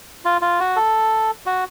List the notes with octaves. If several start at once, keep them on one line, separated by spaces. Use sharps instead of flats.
F4
F4
F#4
A4
F#4